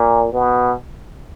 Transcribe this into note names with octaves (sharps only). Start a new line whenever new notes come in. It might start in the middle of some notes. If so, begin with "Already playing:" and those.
Already playing: A#2
B2